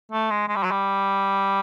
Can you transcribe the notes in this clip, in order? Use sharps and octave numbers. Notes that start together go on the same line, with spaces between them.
A3
G#3
G#3
G3
F#3
G3